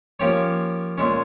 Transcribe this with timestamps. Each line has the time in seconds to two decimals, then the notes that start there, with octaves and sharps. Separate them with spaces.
0.20 F3 A#3 C#4 G4 C#5
0.98 A#2 G#3 C#4